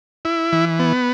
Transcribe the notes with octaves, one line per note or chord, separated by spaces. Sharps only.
E4
E3
B3